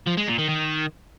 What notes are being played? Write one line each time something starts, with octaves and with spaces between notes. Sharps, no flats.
F3
G#3
A#2
D#3
D#3